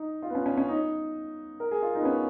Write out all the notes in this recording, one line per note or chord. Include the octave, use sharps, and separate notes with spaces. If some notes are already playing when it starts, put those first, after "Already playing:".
Already playing: D#4
F4
B3
C#4
C#4
C#4
D#4
A#4
G#4
F4
D#4
B3
C#4